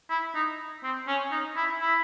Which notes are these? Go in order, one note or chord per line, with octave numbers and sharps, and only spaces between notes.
E4
D#4
C4
C#4
D#4
E4
E4